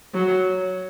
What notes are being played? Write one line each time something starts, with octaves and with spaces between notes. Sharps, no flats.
F#3